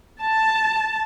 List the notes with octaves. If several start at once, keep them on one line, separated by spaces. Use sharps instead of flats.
A5